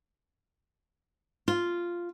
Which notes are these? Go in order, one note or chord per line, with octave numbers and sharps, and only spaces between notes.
F4